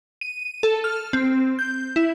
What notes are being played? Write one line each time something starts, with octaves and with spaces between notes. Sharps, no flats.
D#7
A4
F6
C4
G6
E4